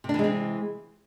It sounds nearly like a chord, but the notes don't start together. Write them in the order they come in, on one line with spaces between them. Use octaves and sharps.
C3 D4 E3 G#3 C4